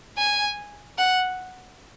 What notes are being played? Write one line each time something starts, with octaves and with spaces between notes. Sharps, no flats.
G#5
F#5